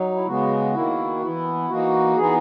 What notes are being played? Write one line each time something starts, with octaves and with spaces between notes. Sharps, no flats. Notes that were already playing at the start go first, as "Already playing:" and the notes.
Already playing: F#3 D#4
E4
C#3 G#3 B3 F#4
D#3 A#3 E4
E3 B3 E4
E3 A#3 D#4 F#4
E3 B3 D#4 G#4